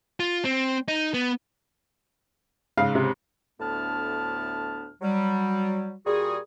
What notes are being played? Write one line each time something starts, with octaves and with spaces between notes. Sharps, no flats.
F4
C4
D#4
B3
G#2 C#3 F5
C3
D2 A2 B3 D4 A5 F6
F#3 G3
A#2 G3 F#4 G#4